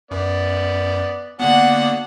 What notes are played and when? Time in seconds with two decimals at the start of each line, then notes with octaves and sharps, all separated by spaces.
0.11 F#2 B3 D5
1.40 D3 A#3 B3 D4 F#4 F#5